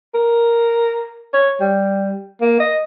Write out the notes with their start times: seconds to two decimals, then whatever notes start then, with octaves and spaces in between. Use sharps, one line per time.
0.14 A#4
1.33 C#5
1.61 G3
2.41 A#3
2.60 D#5